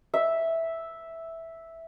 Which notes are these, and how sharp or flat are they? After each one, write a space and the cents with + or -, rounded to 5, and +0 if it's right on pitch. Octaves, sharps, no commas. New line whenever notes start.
E5 -5